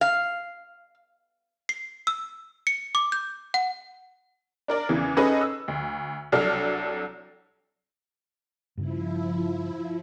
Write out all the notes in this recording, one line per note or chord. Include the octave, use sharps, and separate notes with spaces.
F5
C7
E6
C#7
D6
G6
F#5
D4 A#4 D5
E2 C#3 E3
C#4 D#4 G#4 A4 B4 D#5
E6
D2
C2 F#3 D4 A4 F6
G2 C#3 F3 E4